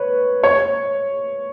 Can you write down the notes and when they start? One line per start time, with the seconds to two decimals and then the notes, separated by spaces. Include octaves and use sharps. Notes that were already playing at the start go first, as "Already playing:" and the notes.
Already playing: B4 C#5
0.44 C#5